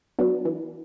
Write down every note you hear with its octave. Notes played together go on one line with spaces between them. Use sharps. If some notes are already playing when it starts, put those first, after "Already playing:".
F#3 B3 D4
E3